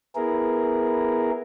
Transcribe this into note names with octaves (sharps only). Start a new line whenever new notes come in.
B3 E4 G#4 A#4